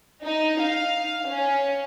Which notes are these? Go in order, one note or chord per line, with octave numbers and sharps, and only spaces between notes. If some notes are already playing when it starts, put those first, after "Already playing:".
D#4
F5
C#4